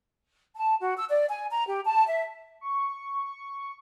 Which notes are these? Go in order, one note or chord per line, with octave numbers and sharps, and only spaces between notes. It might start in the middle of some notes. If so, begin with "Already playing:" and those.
A5
F#4
E6
D5
G#5
A#5
G4
A5
E5
C#6